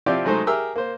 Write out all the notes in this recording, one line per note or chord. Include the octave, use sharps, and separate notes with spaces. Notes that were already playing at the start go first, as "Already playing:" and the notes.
F3 C4 E4 G4 D5
F#3 G#3 A3 D#4 C5
G4 G#4 A#4 E5 E6 F6
A#3 C5